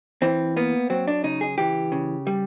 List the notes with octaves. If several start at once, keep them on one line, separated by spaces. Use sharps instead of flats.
E3 C4
A#3 B3
F#3 C4
D4
C#3 D#4
G#4
E3 G4
C#3
G3